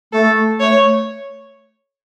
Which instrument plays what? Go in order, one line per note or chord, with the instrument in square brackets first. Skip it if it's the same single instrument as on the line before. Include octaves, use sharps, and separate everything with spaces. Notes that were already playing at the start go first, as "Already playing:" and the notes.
[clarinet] A3 [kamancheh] A4
[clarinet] A3 [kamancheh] C#5